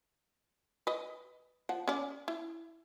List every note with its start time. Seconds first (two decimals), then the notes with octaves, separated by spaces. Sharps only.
0.87 B4 D#5
1.69 F3 F#5
1.88 C#4 D5
2.28 E4